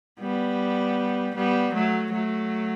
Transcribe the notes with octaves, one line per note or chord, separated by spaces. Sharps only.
G3 B3
G3 B3
F#3 A3
F#3 A3